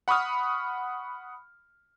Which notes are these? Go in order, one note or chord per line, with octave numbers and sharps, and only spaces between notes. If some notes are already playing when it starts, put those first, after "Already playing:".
F#5 B5 C#6 D#6 F6